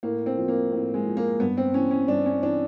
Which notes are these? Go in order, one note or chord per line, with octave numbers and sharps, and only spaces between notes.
A2 A#3
C4
F3
A#3
A2
G#3
F3
A#3
G2 B3
C4
E3 C#4
C#4
G2 D4
C#4
E3 D4